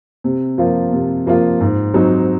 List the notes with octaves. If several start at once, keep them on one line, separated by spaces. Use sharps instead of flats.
C3
F3 A#3 F4
C3
F3 A#3 F4
G#2
F#3 C4 D#4